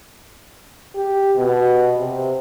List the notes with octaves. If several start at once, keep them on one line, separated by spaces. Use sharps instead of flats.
G4
B2
C3